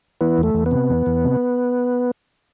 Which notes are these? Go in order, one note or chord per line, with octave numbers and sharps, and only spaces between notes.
E3 B3
E2
A3
E2
B3
C3
E2
E2
C3